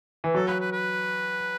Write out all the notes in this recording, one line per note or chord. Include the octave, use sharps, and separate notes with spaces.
E3
F#3 A4
B4
B4
B4